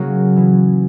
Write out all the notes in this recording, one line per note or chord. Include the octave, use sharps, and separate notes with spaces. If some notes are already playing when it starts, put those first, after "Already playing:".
Already playing: C#3 F#3 A#3 C#4 F#4
E3 B3